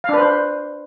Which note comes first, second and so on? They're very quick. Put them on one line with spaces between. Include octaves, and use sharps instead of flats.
F5 D4 B4 C5